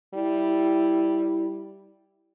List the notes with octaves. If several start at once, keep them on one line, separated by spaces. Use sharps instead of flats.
G3 E4